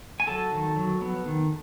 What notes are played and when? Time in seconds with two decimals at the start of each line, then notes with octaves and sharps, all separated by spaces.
0.20 G#5
0.27 F#3 A4 A5
0.52 D#3
0.76 F#3
1.01 B3
1.26 D#3